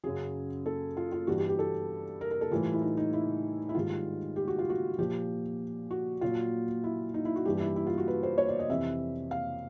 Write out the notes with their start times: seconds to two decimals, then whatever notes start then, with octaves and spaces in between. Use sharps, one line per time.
0.04 F#2 C#3 F#3 G#4
0.66 A4
0.97 F4
1.12 F4
1.27 G2 E3 G3 F#4
1.38 G4
1.49 G4
1.59 A4
2.21 A#4
2.31 A#4
2.41 A4
2.51 A2 E3 G3 F4
2.73 E4
2.82 D#4
2.97 D#4
3.13 E4
3.69 E4
3.75 G#2 D#3 G3 F4
4.36 G4
4.48 F#4
4.59 F4
4.70 F#4
4.98 A#2 F3 G4
5.91 F#4
6.21 A#2 F#3 F4
6.84 E4
7.14 D#4
7.25 E4
7.36 F#4
7.45 G2 E3 G3 G4
7.60 E4
7.76 E4
7.87 F4
7.98 F#4
8.08 B4
8.23 C5
8.38 C#5
8.49 D5
8.59 D#5
8.69 F2 C3 E3 E5
9.31 F5